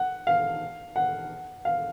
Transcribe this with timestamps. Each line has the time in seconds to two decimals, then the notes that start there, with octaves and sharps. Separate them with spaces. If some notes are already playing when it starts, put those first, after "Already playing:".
Already playing: F#5
0.27 F5
0.96 F#5
1.65 F5